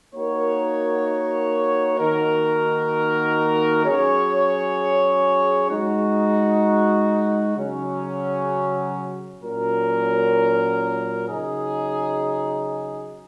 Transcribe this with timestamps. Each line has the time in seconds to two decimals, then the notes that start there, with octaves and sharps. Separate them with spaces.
0.13 A#3 D#4 F#4 A#4 C#5
1.99 D#3 A#3 D#4 F#4 A#4
3.84 F#3 C#4 G#4 C#5
5.69 G#3 D#4 F#4
7.56 C#3 F#3 C#4
9.41 A#2 F#3 C#4 A#4
11.26 C#3 F#3 D#4 G#4